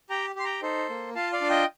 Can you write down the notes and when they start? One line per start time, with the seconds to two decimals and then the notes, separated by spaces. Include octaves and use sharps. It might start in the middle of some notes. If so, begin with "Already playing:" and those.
0.10 G4 G5 A#5
0.36 G4 C6
0.44 G5 A#5
0.62 D#4 A4 C5
0.89 A#3
1.15 F4 F5 A5
1.33 D5 F5
1.41 D4
1.50 D#5 G5